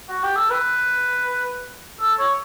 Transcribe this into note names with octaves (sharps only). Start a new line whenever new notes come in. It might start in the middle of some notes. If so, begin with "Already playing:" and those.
F#4
G4
A4
B4
A4
C#5